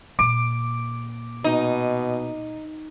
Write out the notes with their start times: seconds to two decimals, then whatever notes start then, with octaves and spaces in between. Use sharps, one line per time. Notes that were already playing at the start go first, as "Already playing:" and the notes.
0.19 A#2 D6
1.44 B2 D#4